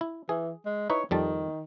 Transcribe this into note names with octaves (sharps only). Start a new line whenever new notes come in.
E4
E3 G#4
G#3
D#4 E4 B4 C#5
F2 D#3 G3 A5